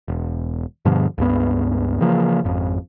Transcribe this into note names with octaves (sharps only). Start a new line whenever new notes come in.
E1
G2 B2 D3 F3
C#2 G2 B3
C#3 E3 F3 A#3
G#1 F2